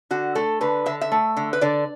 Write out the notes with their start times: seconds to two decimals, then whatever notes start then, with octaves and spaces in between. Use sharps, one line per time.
0.11 D3 F#4
0.35 A3 A4
0.61 D3 B4
0.86 D3 E5
1.01 E5
1.12 A3
1.37 D3
1.53 B4
1.61 D3 D5